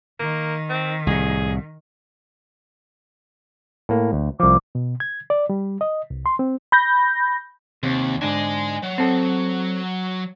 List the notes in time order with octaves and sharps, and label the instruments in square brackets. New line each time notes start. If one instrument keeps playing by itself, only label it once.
[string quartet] D#3 [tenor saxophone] A#3
[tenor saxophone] C4
[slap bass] C2 A2 [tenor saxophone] G#4
[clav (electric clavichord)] A2 A#3
D2
[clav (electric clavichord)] C2 F3 [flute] D6
[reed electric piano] B2
G#6
D5
G3
D#5
C2
C6
C4
[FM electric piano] B5 G6 A#6
[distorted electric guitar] D#2 [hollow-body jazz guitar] C3
[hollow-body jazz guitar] G#2 D3 D4 [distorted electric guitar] D#5 G#5
[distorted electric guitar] F#3
[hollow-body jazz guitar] C4 A4